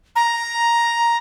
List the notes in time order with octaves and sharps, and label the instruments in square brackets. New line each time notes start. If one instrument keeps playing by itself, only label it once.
[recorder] A#5